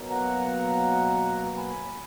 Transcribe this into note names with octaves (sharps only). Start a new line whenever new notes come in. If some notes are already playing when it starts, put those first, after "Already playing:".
Already playing: B2 F#3 A#3
F#5 A#5
G#5 B5